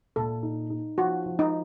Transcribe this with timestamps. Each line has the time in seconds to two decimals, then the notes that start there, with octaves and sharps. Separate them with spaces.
0.16 A#2 A4
0.43 D#4
0.70 D#4
0.98 F3 F#4
1.26 F3
1.39 D#4